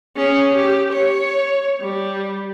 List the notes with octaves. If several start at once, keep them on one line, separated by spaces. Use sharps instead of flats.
C#4 G#4
G4
C#5
G3